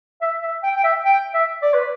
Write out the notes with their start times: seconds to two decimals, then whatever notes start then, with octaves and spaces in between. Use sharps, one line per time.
0.21 E5
0.42 E5
0.64 G5
0.76 G5
0.84 E5
1.05 G5
1.34 E5
1.62 D5
1.74 B4